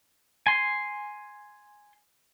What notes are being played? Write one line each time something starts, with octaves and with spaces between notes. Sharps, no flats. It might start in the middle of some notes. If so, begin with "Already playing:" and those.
G#5 C6